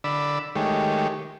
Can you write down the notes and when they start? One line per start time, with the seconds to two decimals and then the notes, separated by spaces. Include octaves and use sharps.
0.04 D3 D5 B5 E6
0.56 D#3 G#3 A3 G4 C#5